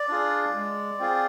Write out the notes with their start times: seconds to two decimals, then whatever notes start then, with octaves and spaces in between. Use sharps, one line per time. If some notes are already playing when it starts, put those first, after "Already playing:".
Already playing: D5
0.09 D4 F4 G#4
0.54 G#3
0.99 C4 F4 G#4